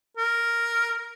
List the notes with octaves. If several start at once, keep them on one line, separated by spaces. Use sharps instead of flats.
A#4